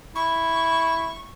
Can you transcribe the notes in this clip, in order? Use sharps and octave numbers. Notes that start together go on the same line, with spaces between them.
E4 C#6